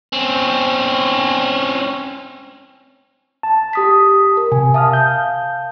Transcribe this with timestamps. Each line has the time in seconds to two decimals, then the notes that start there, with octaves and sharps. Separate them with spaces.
0.13 C4 C#4
3.43 A5
3.73 G4 D#6 B6
4.37 A#4
4.52 C3 G#5
4.74 E5 F5 A5 D#6 F6
4.93 G6